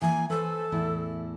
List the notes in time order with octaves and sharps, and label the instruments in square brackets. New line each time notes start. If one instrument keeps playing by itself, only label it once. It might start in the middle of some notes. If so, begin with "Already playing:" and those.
[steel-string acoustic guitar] E3 A#3 [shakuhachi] G#5
[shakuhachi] A4 [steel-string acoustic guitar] B4 C5
[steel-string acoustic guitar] E2 A2 E4